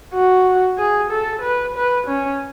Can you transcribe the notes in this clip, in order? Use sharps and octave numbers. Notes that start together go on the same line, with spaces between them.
F#4
G#4
A4
B4
B4
C#4